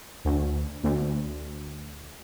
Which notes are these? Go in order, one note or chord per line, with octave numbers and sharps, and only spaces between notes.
D2
D2